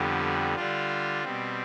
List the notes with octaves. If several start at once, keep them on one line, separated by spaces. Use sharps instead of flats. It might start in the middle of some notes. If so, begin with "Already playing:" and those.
Already playing: F2 D3 G3 B3
D3 G3 D4 F4
B2 G3 C4